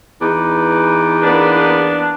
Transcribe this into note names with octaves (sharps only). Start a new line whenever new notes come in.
E2 D#4 B4 D6
A#3 B3 D4